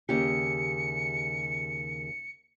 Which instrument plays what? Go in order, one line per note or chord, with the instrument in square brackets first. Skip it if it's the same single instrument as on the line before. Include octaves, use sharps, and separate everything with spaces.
[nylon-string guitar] D#2 C#3 G4 [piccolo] C#7